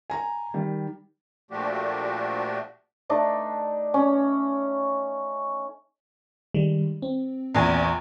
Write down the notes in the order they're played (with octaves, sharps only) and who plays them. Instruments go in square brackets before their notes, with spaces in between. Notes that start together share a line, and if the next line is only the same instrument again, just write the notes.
[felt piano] G#5 A#5
D#3 G3
[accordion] A#2 F3 A3 D4 F#4 G4
[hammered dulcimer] A3 D4 D#4
C#4
[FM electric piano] D#3 G3 G#3
C4
[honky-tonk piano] A#1 E2 G#5